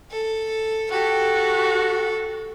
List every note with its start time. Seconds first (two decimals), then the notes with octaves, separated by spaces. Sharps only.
0.11 A4
0.91 F#4 G4 A4